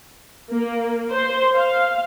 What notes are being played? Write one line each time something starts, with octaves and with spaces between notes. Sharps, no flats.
A#3
C5
F5